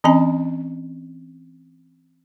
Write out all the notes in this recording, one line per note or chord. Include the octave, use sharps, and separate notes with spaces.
E3 C4 C#4 D#5 G#5 A#5